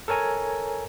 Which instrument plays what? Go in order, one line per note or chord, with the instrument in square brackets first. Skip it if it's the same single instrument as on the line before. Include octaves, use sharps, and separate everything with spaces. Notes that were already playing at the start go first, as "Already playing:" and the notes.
[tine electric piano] A4 A#4 C#5 G#5 A#5